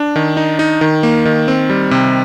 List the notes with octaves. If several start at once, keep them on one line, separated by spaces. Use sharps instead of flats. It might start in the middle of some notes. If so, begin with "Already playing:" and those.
Already playing: D4
D#3
D#4
D#4
D#3
A#3
D#3
C4
G3
C3